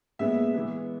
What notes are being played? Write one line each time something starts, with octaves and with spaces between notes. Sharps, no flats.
A#2 G#3 B3 E5
E3 G#3 B3